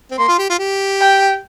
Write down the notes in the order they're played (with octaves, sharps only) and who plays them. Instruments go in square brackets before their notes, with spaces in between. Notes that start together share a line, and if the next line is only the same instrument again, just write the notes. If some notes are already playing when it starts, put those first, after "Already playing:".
[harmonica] C4
[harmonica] A#3 [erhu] C6
[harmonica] F4
G4
F4
G4
[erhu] G5